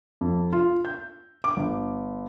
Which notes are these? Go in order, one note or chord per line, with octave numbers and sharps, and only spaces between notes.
F2
F4
G6
D6
G1